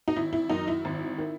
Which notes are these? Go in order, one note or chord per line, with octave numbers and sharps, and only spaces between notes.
D#4
G#1 E4
E4
F#2 D#3 D#4
E4
G#1
D#3